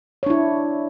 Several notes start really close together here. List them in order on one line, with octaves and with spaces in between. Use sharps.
C#5 D4 E4